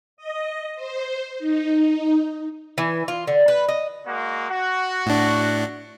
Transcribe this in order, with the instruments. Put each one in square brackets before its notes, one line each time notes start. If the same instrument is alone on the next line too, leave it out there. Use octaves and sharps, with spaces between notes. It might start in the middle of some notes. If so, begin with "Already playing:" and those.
[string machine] D#5
C5
D#4
[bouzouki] E3
F4
D3
B4
D#5
[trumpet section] G#3 A#3 F#4
F#4
[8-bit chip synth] A2 D4